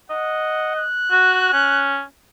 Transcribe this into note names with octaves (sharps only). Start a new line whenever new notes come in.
D#5 F#5
F#6
F#4
C#4